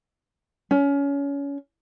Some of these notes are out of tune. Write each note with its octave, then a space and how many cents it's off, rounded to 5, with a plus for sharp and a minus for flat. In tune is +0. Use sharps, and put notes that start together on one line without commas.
C#4 +25